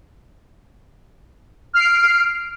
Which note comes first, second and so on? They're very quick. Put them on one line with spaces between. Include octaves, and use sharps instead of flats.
F6 C7 D7